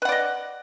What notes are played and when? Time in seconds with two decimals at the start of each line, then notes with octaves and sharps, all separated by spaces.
0.02 B4
0.05 F#5
0.09 D5
0.12 D#5